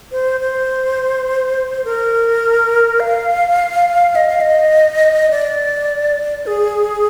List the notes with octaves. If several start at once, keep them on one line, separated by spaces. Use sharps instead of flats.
C5
C5
A#4
F5
D#5
F5
D#5
D5
G#4